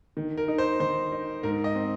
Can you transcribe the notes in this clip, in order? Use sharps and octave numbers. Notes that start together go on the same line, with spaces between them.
D#3
A#4
D#4
C5
D#3 C5
D#4
G#2 A#4
D#5
C4